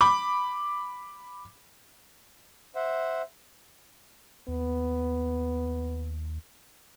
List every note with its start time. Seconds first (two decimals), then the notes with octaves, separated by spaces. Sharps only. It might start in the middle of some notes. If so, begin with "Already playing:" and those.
0.01 B5 D6
2.75 C5 E5 F#5
4.48 D#2 B3